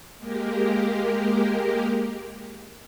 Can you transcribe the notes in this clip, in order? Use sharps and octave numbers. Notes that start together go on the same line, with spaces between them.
G#3 A#3 G4 A#4